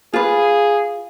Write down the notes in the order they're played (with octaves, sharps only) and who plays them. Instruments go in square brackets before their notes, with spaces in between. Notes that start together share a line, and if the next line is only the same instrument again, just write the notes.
[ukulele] F4 B4 [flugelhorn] G#4